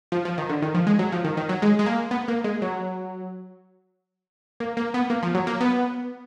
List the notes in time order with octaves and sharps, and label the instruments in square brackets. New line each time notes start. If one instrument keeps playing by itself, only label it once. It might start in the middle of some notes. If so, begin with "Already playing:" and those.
[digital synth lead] F3
F3
D#3
D3
D#3
F3
G#3
F#3
F3
D#3
D#3
F#3
G#3
G#3
A#3
B3
A#3
G#3
F#3
A#3
A#3
B3
A#3
F3
F#3
A#3
B3